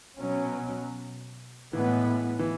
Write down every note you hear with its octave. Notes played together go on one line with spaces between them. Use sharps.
B2 F#3 C#4
A2 E3 G#3 B3
E3